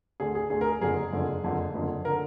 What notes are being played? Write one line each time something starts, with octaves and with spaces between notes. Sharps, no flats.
D2 D3 G#4
G#4
D2 D3 G#4
A#4
F#1 F2 D3 G#4
F#1 F2 D3
F#1 F2 D3
F#1 F2 D3
D3 A#4